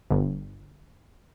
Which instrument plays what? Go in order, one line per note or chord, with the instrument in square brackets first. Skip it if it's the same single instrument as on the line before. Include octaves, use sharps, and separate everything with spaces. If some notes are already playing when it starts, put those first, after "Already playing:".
[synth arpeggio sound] G1